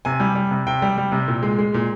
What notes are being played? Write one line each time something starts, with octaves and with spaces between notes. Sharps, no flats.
C3 G#5
G3
G3
C3
C3 G5
G3
G3
C3
A#2
G#3
G#3
A#2